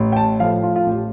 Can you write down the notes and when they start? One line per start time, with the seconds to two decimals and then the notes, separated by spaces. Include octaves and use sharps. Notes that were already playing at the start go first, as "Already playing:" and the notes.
Already playing: A1
0.12 G5
0.17 A5
0.40 A2 F3 F5
0.63 F4
0.76 F4
0.86 A1 G4